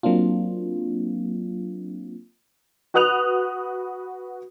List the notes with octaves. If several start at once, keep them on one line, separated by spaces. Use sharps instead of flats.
F#3 A#3 C4 D4 F4
F#4 B4 D#6 F#6 F7